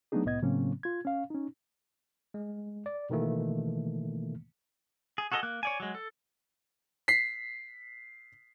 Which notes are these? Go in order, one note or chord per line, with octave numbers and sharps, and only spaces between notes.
F#3 A3 B3 D4 D#4 G#4
C2 A2 B3 D#5 G#6
A2 C#3 F#3 A#3 C4 C#4
F4 G#6
C#4 F5
C#4 D#4
G#3
D5
B2 D#3 E3 A3 A#3
G#4
F#4 G#4 A4 C5 D#5
A#3 F#6
C#5 D5 G#5
F#3 G#3
A4
B6 C7